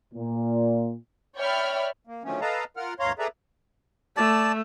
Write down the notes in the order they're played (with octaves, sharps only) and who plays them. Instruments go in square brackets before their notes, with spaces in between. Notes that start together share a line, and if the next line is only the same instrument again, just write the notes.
[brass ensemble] A#2
[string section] C#5 D5 E5 G5 B5 F6
[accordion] A#3
D3 D#3 F3 F#3 A3 C#4
A4 B4 D#5 F5 A5 A#5
F4 A#4 F#5 F6
D2 G2 C#5 F5 A#5 C6
G#4 A4 B4 D5 E5 A#5
[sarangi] A3 [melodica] D5 A5